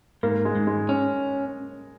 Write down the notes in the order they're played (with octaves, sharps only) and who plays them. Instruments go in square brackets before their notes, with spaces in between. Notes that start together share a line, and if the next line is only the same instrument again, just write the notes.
[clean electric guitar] G#2 [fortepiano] A#3
[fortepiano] G#3
[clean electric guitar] G#2
[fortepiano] G#3
[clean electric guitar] C#4